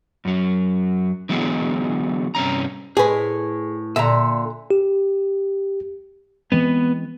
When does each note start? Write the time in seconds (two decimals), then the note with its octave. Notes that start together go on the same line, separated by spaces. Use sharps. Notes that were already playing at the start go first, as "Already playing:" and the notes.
0.25 F#2 F#3
1.29 D3 E3 F#3 G#3 B3
2.35 G2 C3 C#4 A#5
2.97 A2 G#4 B4
3.96 A#2 D3 E5 A#5
4.71 G4
6.52 E3 G#3 B3 C4